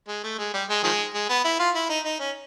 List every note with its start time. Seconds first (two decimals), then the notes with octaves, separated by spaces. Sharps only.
0.08 G#3
0.23 A3
0.38 G#3
0.54 G3
0.69 G#3
0.84 D#3 F3 G#3
1.14 G#3
1.29 B3
1.44 E4
1.59 F4
1.75 E4
1.89 D#4
2.05 D#4
2.20 C#4